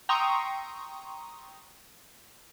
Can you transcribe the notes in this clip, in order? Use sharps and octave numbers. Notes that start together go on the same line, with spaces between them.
G5 A#5 C6 C#6 D#6 E6